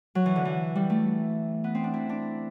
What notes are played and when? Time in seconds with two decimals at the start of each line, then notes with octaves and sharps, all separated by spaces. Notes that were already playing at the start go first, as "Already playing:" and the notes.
0.15 F#3
0.26 E3
0.36 D3
0.45 E3
0.76 G3
0.90 A3
1.64 B3
1.75 C4
1.84 D4
1.94 E4
2.09 D4